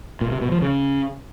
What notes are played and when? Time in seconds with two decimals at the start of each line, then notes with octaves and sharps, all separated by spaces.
0.21 A#2
0.31 C3
0.42 B2
0.52 F3
0.62 C#3